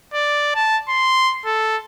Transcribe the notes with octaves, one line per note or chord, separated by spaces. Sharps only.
D5
A5
C6
A4